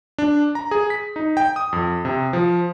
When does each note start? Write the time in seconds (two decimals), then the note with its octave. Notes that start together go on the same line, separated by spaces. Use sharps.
0.18 D4
0.55 A#5
0.71 G#4
0.90 B6
1.16 D#4
1.37 G5
1.56 D#6
1.73 F2
2.05 C3
2.33 F3